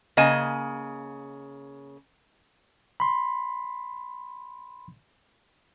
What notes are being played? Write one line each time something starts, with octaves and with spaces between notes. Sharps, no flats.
C#3 A#3 D#5 G#5
B5 C6